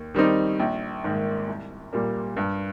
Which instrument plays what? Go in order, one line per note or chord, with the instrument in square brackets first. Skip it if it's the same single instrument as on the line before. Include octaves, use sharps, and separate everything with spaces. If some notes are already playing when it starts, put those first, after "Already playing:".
Already playing: [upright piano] D#2
D#3 G3 C4 D#4
A#1
G#2 D#3 A#3
C2
A#2 G3 A#3
G2